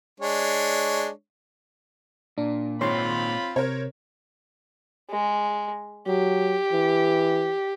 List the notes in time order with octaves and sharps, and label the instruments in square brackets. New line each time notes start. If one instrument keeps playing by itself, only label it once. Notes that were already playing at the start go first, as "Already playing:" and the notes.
[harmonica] G#3 D4 C#5
[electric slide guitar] A#2 [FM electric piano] D4
[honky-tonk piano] G#1 G#2 [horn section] C4 F4 B5 [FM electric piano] C#5 C6
[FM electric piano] C3 [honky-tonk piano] A#4 C5 C#5
[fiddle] G#3
[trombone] F#3 [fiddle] G4
[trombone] E3